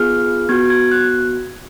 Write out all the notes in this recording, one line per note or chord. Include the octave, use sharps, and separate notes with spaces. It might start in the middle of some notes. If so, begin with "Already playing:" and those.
Already playing: B3 F4 G#4 F6
B3 F#4 G#6
G#6
F#6